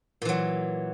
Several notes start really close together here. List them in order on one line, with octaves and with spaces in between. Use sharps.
A#2 E3 F#3